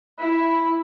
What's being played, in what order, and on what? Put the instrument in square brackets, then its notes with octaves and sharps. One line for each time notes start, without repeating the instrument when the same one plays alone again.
[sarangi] E4 [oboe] B5